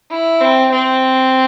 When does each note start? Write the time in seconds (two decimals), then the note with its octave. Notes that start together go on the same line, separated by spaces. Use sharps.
0.11 E4
0.41 C4
0.71 C4